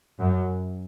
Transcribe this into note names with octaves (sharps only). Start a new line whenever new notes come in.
F#2